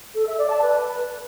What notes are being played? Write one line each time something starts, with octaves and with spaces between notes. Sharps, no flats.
A4
E5
D5
A5
B4